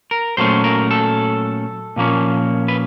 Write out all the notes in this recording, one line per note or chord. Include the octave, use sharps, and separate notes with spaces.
A#4
A#2 F#3 A3 C#4 C5
A#4
A4
A#2 F3 A#3 C#4
B4